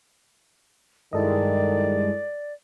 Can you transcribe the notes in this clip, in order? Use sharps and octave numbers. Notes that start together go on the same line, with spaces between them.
G2 D#3 G#3 E4 A4 D5 D#5